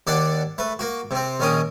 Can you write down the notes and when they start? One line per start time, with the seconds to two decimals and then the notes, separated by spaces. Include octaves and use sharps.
0.07 D#2 D4 D5 F#5
0.58 A3 B4
0.79 A#3 F#4
1.11 C3 C4
1.40 A#1 D#3 C#4 A#4 D#6